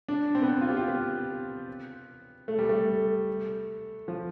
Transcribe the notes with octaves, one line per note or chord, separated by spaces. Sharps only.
D4
C4
B3
C4
F4
G4
F4
B3
A3
G3
A3
F3